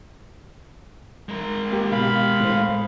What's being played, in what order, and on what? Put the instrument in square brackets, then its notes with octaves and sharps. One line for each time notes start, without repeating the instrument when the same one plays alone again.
[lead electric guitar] G#3 A#4
[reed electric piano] A#3 G4
[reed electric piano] B2 [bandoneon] F5 B5
[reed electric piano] A2 C5